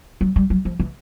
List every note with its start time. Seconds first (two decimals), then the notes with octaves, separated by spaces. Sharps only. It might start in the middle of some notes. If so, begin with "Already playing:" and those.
0.21 F#3
0.36 G3
0.50 F#3
0.65 F3
0.80 E3